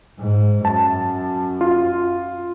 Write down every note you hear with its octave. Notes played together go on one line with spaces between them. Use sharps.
G#2
F#2 A5
F4